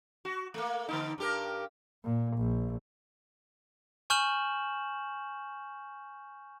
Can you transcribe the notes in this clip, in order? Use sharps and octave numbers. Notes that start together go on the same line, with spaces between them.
F#4
A3 A#3
D3 A#3 D#4
G2 G4 A#4
A#2
A#1
G#5 C#6 F6 G6 E7 F#7